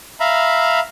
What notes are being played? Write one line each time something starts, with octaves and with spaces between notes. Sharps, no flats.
E5 F5 A#5 B5